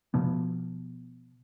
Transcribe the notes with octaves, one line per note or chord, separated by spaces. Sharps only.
B2 F3 B3